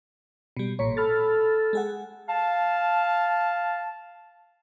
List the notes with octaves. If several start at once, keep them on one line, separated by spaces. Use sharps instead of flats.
B2 G3
A1 A#2 C#5
A4 B5 F6 A6
G#3 G#4 F#5
F5 A5